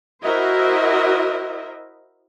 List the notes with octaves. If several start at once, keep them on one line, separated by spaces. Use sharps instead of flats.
E4 F#4 A#4 C5 D#5 E5